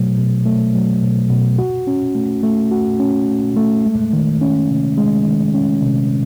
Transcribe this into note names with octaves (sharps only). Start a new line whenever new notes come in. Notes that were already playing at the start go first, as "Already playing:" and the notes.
Already playing: B2 F#3 A3
B2
A3
F#3
B2
B2
F#4
C#4
A3
A3
F#4
C#4
A3
A3
G#3
D#3
C#4
C3
G#3
D#3
C#4
C3